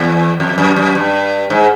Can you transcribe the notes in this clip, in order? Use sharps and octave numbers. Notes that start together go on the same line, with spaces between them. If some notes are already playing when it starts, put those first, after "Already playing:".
Already playing: E2
F2
F#2
F#2
G2
G#2